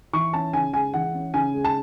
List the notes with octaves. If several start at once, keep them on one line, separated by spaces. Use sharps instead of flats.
E3 C#6
C#4 A5
C#3 G#5
G#3 G#5
E3 F#5
C#4
C#3 G#5
G#3
A5